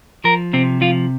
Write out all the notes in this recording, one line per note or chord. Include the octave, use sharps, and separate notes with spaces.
F3 A#4
C3 C4
F3 F4